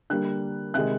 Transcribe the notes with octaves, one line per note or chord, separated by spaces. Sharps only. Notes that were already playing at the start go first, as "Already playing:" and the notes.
D3 G3 A#3 F#6
C3 D#3 G#3 F#6